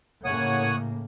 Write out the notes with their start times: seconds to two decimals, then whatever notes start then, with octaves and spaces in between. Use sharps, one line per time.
0.25 A2 C#3 A#3 C#5 F#5 D#6